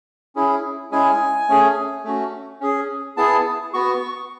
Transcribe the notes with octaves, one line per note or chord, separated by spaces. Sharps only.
C#4 E4 G#4
G#3 C#4 E4 G#4 G#5
A3 C#4 G#4
A3 C#4 F#4
C#4 G#4
B3 E4 G#4 A5
B3 F#4 C#6